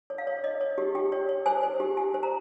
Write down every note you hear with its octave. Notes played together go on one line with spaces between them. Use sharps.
C#5
F5
C#5
C#5 D#5
C#5
G4
G4 G5
C#5
C#5
C5 G#5
C5
G4
G4 G#5
C5
A#5